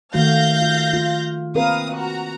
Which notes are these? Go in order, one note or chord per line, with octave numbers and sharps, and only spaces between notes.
D#3 A3 F#4 F5 G6 A#6
F4
F4
C4 A#4 B4 F5 D#6
F#4 A#5